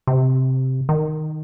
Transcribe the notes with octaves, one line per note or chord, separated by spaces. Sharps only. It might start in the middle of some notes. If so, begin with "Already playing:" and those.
C3
D#3